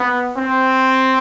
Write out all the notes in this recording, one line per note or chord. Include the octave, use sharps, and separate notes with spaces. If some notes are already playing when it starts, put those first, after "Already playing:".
Already playing: B3
C4